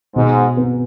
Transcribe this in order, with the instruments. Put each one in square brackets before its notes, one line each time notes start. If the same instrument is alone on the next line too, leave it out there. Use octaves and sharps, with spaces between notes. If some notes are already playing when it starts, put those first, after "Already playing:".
[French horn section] G#2 [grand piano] B2
[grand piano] B3